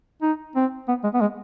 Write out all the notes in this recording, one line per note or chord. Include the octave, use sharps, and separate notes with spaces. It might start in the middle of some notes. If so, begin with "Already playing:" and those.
D#4
C4
B3
G#3
B3
G#3